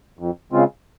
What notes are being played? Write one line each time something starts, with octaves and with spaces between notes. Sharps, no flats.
F2
C#3 G#3 C4 F4